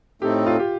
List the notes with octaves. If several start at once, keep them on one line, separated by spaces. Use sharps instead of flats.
A2 A3 C4 D#4 G4 A4
F4
G4